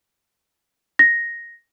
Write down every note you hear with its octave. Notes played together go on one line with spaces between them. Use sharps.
A#6